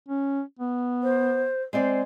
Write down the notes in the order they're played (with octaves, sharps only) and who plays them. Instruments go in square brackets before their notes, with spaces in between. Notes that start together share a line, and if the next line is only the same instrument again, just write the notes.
[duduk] C#4
B3
[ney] C5
[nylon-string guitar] G#3 C4 D5 [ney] C5